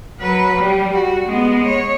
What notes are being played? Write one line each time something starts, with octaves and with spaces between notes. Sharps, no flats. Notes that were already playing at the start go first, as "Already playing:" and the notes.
F#3 B4
G3
F#4
G#3 B3
C#5